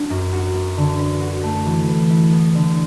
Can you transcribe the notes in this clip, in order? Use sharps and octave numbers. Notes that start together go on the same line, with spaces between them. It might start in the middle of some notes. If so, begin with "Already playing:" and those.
Already playing: F#3 D4
F#2
F#4
B3
D3
B4
F#4
A3
E3
B4
E4
B3
D3